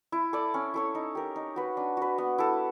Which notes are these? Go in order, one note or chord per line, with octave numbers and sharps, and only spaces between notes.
E4
A4 D5
C#4
E4 A4 C#5
D#4
G4 A#4
D#4
F#4 B4
D4
F#4 B4
B3
E4 A4